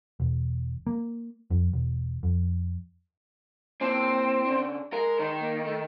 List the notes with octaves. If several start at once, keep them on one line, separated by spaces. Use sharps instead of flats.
E1
A#3
F2
E1
F2
A#3 C4 E4 A5
C#3 D4
G#3 A#4
D#3
A#3
A3